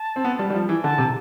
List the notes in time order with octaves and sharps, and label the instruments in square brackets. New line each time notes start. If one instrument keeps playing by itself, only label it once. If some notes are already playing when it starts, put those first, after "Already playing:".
Already playing: [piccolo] A5
[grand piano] C4
B3
G3
G3
F3
E3
[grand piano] D3 [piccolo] A5
[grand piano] C3